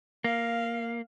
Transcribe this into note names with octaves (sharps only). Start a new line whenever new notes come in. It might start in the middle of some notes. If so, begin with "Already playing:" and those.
A#3 F5